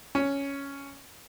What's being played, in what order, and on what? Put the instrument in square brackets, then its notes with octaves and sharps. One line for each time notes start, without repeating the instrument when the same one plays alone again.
[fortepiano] C#4